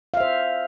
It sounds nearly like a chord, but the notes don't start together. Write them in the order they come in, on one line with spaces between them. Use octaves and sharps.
F5 E5 C5